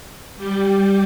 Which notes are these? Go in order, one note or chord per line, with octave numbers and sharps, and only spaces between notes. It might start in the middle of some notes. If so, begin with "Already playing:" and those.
G3 G4